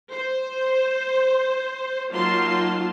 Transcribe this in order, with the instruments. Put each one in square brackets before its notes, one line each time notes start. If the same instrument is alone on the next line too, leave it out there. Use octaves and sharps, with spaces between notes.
[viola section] C5
F#3 A#3 D#4 F4 A5 C6